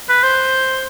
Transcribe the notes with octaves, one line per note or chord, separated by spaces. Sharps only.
B4
C5